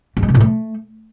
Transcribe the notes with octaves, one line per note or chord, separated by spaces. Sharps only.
G#2
G#3
C3
A2
A3